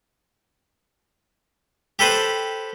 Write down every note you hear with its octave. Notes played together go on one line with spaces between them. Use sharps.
G4 A4 B4 C5